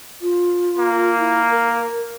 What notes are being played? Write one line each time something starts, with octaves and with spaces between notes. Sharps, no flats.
F4
A#3
E4
A#4